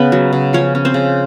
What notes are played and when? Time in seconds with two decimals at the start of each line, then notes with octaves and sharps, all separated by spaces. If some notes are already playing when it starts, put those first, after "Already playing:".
Already playing: C#3 B3 B4
0.12 F#3
0.33 C#3
0.53 F3 C#4 C#5
0.75 C#4
0.85 C4 C5
0.94 C#3